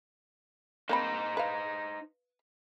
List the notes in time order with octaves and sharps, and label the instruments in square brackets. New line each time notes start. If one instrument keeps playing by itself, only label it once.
[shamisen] A#3 C4 B5 [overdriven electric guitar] D#4 C5
[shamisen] B4 F5